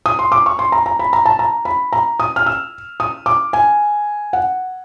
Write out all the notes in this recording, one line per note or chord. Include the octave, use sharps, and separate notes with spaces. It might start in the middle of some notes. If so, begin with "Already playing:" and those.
D#6
C6
D6
C#6
C6
A#5
A#5
B5
A#5
A5
A#5
B5
A#5
D#6
F6
E6
D#6
D6
G#5
F#5